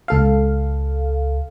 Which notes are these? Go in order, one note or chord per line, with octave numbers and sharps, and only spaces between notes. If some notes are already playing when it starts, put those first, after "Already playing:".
C#2 A4 F5